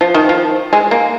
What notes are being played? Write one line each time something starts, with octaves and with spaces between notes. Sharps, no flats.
F3
D#3
F3
G#3
A#3